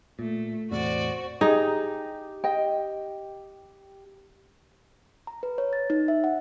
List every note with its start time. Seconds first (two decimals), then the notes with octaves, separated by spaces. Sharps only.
0.19 A#2 A3
0.71 E2 A2 C3 F#4 C5 D5
1.41 D#4 G4 G#4
2.44 D#5 G5
5.27 A#5
5.43 B4
5.58 C#5
5.73 A6
5.90 D#4
6.08 E5
6.24 F#5